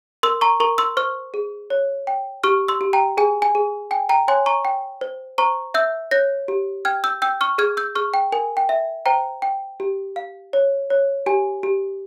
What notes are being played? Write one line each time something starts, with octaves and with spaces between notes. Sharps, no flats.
A#4 C6 E6
A#5 C#6
A#4 A#5 C#6
C6 E6
C5 C#6 F6
G#4
C#5
G5
G4 C#6 F6
C6 E6
G4
G5 A#5
G#4 G#5
G#5
G#4
G5 G#5
G5 A#5
C#5 G#5 C6
A#5 C#6
G5
C5
C5 A#5 C#6
E5 E6 G6
C#5 G6 A#6
G4
G5 F6 G#6
E6 G6
G5 E6 G6
C#6 F6
G#4 F6 G#6
E6 G6
G#4 C#6 F6
G5
A#4 G#5
G5
E5
C5 G5 A#5
G5
G4
F5
C#5
C#5
G4 G#5
G4